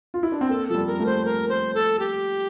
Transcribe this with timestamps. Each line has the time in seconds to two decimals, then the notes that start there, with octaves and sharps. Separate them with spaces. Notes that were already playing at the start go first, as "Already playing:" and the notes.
0.14 F4
0.23 E4
0.32 D4
0.41 C4
0.49 A#3 A4
0.68 F3 A4
0.75 G3
0.87 A#4
1.00 A3
1.06 C5
1.25 A#4
1.49 C5
1.75 A4
1.99 G4